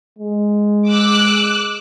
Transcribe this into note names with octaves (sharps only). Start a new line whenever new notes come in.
G#3
D6 E6 F#6